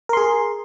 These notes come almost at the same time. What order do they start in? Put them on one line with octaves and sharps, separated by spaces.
A#4 C6 G#4